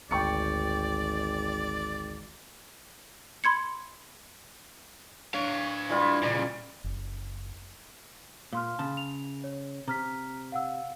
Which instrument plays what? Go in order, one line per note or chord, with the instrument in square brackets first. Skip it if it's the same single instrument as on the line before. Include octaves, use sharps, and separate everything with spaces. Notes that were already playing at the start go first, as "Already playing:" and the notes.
[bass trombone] G#1 [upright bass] D2 [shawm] D5 [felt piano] G5 C#6 C#7
[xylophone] B5 C6 G#6 C#7
[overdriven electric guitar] D4 F5 [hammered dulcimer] C#5
[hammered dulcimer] E3 G3 F4
[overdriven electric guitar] A#2 C#3 [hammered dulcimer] D5
[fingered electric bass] F#1
[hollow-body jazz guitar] A#2 [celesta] F5 C6 F6
[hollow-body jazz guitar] C#3 A5
[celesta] F7
C#5
[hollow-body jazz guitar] C3 [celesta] A#5 F6 B6
[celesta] F5 F#5 E6